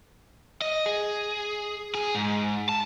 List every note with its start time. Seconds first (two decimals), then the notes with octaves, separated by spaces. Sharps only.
0.62 D#5
0.86 G#4
1.95 G#4
2.15 G#2
2.69 A5